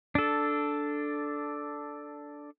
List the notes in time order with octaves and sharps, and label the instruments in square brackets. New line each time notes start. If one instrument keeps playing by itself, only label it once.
[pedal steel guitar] D4 A4